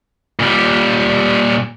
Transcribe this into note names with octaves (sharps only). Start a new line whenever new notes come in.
A#2 G3